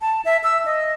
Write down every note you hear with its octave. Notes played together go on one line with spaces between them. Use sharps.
A5
E5
E6
D#5